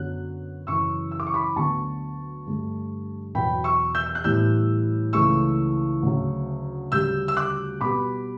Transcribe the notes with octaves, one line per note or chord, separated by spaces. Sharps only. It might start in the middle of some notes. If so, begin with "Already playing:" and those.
Already playing: F#2 D3 F#3 B3 F#6
F#2 C#3 E3 C#6 E6
E6
D6
C#6
B5 D6
D2 D3 F#3 B3 A5 C#6
G2 D3 A3
E2 B2 F#3 B3 G5 B5
C#6 E6
E6 G6
E6
F#6
A2 E3 G3 B3 E6 G6
C#2 C#3 E3 A3 C#6 E6
D2 C#3 F#3
D2 C#3 G3 E6 G6
E6
D6 F#6
B2 G3 B3 B5 D6